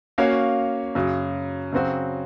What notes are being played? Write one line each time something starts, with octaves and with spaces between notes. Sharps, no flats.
A#3 C#4 F#4 C#5 F5
F#2 C#3 F#3
C#3 F#3 C4 F#4